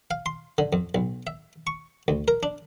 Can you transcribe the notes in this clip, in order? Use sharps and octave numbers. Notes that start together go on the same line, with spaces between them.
F5
C6
D3
F2
B1
E5
C#6
D2
A#4
D4